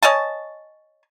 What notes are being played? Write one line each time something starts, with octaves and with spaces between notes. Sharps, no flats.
C#5 D#5 G#5 A5